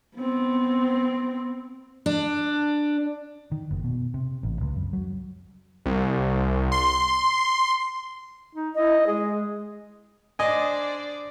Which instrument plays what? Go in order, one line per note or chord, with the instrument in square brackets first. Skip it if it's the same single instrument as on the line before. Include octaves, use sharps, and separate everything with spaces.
[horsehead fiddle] B3 C4
[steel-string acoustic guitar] D4
[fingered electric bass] D#3
F#1
B2
C3
A1
C#2
F#2
F#3
[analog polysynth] C2
C6
[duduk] D#4
[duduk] E4 [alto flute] D#5
[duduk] G#3 [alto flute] G#4
[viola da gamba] D4 C5 D5 [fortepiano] D#5 G#5